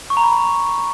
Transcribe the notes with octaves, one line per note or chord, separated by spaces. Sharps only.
C#6
A#5
B5